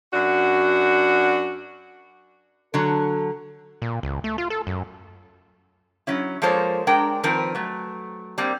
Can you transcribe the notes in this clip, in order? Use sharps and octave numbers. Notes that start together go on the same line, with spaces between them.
F#2 D4 F#4
D3 F#3 A4
A#2
C#2
A3
F4
A4
F#2
F#3 C#4 E4
F3 G#3 A#3 A4 C5 C#5
G#3 D4 A#4 G5 A#5
D#3 F3 C4 A#4 B4
F#3 A3
G3 A#3 C4